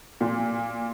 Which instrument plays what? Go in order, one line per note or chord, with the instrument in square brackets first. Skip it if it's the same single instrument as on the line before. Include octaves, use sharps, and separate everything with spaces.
[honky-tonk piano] A#2